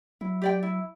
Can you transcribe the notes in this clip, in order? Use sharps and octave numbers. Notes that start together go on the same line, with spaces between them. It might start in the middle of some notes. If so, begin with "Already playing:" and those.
F#3 E4
G4 D5 G5
E4